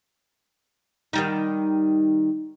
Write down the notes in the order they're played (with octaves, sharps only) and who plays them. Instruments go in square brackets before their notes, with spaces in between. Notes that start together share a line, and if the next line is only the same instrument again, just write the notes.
[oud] D#3 G3 D#4